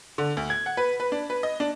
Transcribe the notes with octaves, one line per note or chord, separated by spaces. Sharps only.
D3
D2
G#6
F#5
B4
B4
D4
B4
D#5
D4